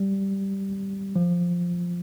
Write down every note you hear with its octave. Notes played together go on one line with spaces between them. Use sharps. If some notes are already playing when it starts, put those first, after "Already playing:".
Already playing: G3
F3